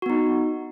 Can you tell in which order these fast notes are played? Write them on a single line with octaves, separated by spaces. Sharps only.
F#4 B3 D#4